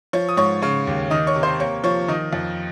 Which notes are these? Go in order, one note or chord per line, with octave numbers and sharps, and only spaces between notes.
F3 C#5 C#6
D#6
G#2 C#5 C#6
C#3 C#5 C#6
D#2
D#3 D#5 D#6
C#5 C#6
C3
C5 C6
A#3 C#5 C#6
F3 C#5 C#6
D#3 D#5 D#6
F2